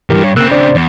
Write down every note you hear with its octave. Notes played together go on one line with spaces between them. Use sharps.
D2 G2 E3 G4 A#4
C#5
C#3 A#3 C4 E6 F#6
D4 C5 D5
E2